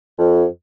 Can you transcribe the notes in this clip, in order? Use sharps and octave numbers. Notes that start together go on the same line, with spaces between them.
F2